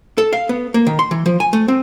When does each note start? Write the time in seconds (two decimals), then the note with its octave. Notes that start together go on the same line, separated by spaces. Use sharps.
0.18 A4
0.33 F5
0.49 B3
0.74 A#3
0.87 D#3
0.99 C6
1.11 E3
1.26 F3
1.40 G#5
1.53 A3
1.68 C4